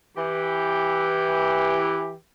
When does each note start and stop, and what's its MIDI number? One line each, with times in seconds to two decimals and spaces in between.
0.16 2.13 52
0.16 2.13 67